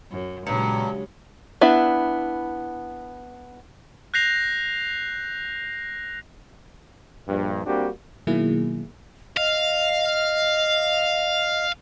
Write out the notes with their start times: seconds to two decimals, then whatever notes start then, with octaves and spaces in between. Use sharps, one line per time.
0.11 F#2
0.47 G2 A#2 C#3 F#3 G#3 A#5 C#7
1.61 B3 D4 E4 E5
4.14 F#6 G6 A#6 C7 F7
7.28 A#1 G2
7.66 G3 A#3 C4 D4 F#4 G4
8.27 B2 D#3 F#3 A#3 E4 G#4
9.37 D#5 F5